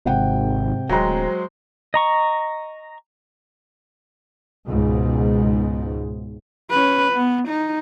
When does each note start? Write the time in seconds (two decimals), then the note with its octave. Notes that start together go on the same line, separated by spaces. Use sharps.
0.05 G#1 G#2 C3 F#5 G5
0.89 D1 F#3 G#3 C5 G5 A#5
1.94 D#5 A#5 C#6
4.68 C#2 G#2 B2
6.70 C#4 B4
7.13 B3
7.49 D#4